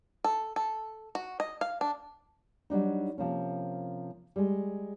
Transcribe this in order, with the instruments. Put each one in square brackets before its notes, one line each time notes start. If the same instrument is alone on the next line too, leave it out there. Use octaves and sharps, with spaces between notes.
[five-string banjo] A4
A4
F#4
D#5
F5
D4
[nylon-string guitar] F#3 G3 D4 D#4
C3 F3 A#3 C#4
G3 G#3